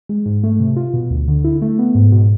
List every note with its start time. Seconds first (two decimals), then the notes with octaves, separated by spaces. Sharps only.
0.09 G#3
0.26 G#2
0.43 A3
0.60 C3
0.76 F4
0.94 B2
1.10 D2
1.28 D3
1.44 E4
1.62 A3
1.79 B3
1.95 G#2
2.12 B2